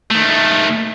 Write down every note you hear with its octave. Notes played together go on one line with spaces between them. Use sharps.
D#3 A3